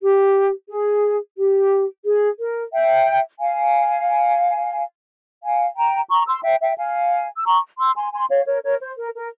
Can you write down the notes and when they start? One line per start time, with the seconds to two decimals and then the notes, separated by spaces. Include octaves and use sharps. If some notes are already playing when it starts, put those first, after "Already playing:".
0.02 G4
0.69 G#4
1.37 G4
2.04 G#4
2.39 A#4
2.72 E5 G5
3.40 F5 G#5
5.42 F5 G#5
5.77 G5 A#5
6.10 A#5 C#6
6.27 C6 E6
6.44 E5 G5
6.61 E5 G5
6.77 F5 G#5
7.37 E6
7.45 A#5 C#6
7.79 C6 E6
7.96 G#5 C6
8.13 G#5 C6
8.29 C#5 F5
8.46 A#4 C#5
8.63 A#4 C#5
8.81 C5
8.97 A#4
9.15 A#4